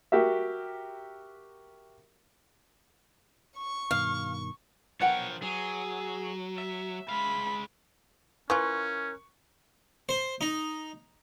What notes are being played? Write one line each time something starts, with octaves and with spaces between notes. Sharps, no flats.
F#4 G4 A#4 E5
C#6
G2 B2 D#3 F5
B1 F3 A#4 B4 C#5 F#5 G5
F#3 G#4
E5
G#3 F5 B5
E3 C#4 F4 A#4 C#6 F#6
C5
D#4